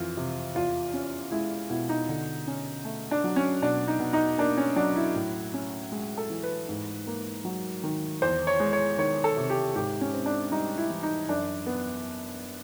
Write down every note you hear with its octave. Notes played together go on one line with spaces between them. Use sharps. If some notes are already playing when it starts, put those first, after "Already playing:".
Already playing: F2 E3 F4
C3
E2 F4
C#4
G#3 E4
B2 E4
D#4
D3
C#4
A3
D4
F#3
C#4
B2 D4
D#4
B2
D#4
A#3 D4
C#4
F#3 D4
E4
A2
C#4
G#3
A4
E3
B4
G#2
A#3
F#3
D#3
E2 C5
C#5
G#3
C#5
D#3 C#5
A4
C3
G4
G#2 G4
C#4
C4
D4
G3 D#4
E4
E3
D#4
F#2 D4
B3